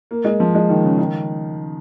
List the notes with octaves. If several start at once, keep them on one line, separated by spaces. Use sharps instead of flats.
A#3
G#3
F3
G#3
D#3
C#3
D#3